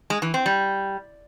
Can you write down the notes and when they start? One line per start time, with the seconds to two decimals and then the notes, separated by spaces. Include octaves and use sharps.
0.10 G#3
0.22 E3
0.34 C4
0.46 G3